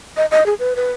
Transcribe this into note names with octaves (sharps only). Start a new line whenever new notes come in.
D#5
D#5
G#4
B4
B4